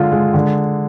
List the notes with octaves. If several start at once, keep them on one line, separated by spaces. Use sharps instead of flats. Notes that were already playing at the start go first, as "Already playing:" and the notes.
Already playing: D3 G#3 F4
G#3
D3